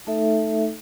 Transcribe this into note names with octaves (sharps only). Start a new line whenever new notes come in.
A3 D#4 A4 E5